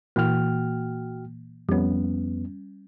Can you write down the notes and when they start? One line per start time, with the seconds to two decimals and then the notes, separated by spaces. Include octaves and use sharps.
0.16 A#2 E3 A#3 F#4 G5 F6
1.69 F2 G3 B3 C#4